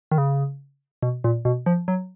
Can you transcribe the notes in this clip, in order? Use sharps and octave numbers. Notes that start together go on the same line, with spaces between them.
D#3
C#3
B2
A#2
B2
F3
F#3